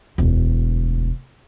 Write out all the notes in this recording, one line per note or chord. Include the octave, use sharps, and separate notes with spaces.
E1 D2